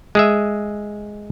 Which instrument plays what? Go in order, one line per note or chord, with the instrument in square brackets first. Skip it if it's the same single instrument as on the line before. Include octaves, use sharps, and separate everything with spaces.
[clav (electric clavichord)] G#3 G#4 E5